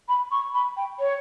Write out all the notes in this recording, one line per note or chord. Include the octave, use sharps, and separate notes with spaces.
B5
C#6
B5
G5
C#5